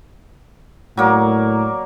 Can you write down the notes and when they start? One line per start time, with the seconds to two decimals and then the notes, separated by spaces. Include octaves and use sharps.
0.97 A2 F#3 A#3 D5